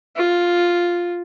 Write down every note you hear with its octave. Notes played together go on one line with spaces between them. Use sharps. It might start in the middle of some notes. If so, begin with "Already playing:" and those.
F4